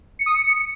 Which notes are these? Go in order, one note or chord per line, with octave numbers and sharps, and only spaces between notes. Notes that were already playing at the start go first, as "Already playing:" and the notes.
C#7
D#6
C#7